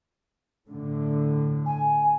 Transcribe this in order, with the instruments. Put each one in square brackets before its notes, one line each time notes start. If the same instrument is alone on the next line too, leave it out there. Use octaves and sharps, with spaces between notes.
[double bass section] A2 D3
[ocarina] G#5